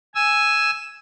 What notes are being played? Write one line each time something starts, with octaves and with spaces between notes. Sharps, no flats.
G#5 E6